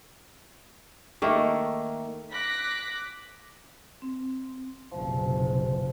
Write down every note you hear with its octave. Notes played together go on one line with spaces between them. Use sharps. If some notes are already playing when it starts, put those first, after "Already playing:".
D#3 A3 A#3
D6 F#6 A#6 B6
C4
F#1 B1 C3 F3